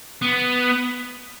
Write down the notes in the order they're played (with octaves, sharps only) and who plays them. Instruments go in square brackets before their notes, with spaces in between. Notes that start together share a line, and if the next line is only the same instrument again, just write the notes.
[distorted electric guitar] B3